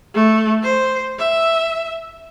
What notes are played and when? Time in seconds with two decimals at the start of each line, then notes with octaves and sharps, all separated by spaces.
0.14 A3
0.63 C5
1.19 E5